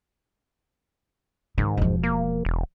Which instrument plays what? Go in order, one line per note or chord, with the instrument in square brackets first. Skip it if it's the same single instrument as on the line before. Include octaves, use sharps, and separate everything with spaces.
[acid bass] G#2 [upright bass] D#3
[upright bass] E1 F3
[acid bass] A#3
E1